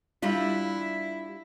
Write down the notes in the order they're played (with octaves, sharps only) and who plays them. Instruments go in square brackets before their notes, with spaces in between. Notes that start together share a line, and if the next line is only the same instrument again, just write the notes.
[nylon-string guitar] G3 D4 F4 [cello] E4